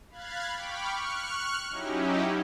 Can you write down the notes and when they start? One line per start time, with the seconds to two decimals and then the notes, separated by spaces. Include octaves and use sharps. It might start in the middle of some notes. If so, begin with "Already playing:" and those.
0.10 F5 B5 F#6 G#6 A6
0.55 G5 B5 C#6 D6 F6
0.91 C#6 F6 F#6
1.69 F#3 C#4 D#4 E4 G4